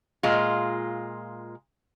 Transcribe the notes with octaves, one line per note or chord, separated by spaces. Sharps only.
A#2 G#3 F4